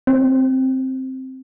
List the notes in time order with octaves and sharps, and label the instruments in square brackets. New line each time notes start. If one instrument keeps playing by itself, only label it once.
[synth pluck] C4